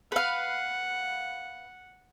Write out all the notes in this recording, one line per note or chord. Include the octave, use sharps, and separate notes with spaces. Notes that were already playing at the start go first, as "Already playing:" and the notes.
B4 F5 F#5